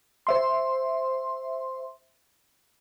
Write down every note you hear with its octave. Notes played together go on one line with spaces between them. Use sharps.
C5 E5 C6